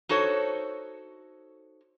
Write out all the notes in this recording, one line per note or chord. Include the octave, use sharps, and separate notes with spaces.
D#4 F#4 A4 C5 C#5